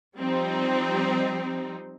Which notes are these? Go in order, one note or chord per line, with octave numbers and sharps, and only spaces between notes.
F3 G3 C4 D#4